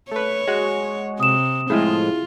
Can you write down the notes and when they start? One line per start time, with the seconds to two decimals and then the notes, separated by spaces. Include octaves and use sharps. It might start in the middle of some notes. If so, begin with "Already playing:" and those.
0.11 A3 B4 C#5
0.48 G#3 F#4
1.20 C3 D#6 E7
1.70 A2 F3 G#3 E4 F4 G#4